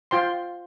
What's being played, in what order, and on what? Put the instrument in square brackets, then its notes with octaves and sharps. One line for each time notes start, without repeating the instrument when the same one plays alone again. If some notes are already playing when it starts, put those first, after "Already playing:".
[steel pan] F4 C5 G5 C6